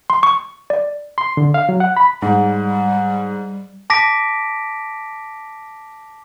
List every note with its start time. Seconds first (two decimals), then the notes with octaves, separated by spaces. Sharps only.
0.10 C6
0.23 C#6
0.70 D5
1.18 C6
1.37 D3
1.54 F5
1.69 F#3
1.80 F#5
1.97 B5
2.22 G#2 G3
3.90 A5 D6 A#6 B6 D7